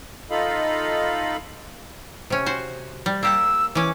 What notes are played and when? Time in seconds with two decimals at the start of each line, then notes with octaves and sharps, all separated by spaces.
0.31 D#4 F4 A4 D#5 F5 B5
2.30 C3 C#4
2.46 F#4 C5
3.06 G3
3.23 A#3 G4 F#5 E6
3.75 E3 C#4 D6